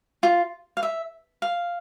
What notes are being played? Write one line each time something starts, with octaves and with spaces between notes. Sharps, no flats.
F4
F5
E5
F5